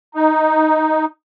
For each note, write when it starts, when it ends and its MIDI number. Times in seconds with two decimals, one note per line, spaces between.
0.15 1.05 63